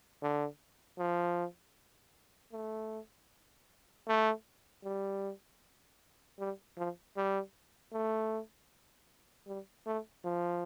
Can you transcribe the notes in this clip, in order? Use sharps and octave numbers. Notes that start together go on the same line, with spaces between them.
D3
F3
A3
A3
G3
G3
F3
G3
A3
G3
A3
F3